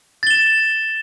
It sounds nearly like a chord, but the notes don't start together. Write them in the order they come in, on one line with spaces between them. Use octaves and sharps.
A6 G7 E7